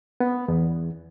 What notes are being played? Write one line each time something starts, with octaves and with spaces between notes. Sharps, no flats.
B3
E2